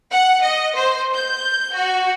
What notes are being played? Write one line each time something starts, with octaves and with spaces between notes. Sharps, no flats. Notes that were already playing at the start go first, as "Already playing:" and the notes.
F#5
D#5
C5
G6
F#4